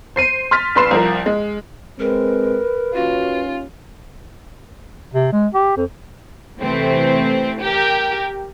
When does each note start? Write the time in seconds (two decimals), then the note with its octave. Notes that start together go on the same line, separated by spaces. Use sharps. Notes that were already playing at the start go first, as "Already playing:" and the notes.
0.16 C5 C7 D#7
0.51 C6 F6 A6 B6
0.75 A#1 B4 C6 C7 E7
0.91 C2 F3 A#4
1.26 G#3
1.99 G#3 C4 A#4 B4
2.94 D#2 C#4 F4 F#4
5.14 C3
5.32 G#3
5.54 G4
5.76 F2
6.60 C3 E3 A3 C4
7.62 G4 A#4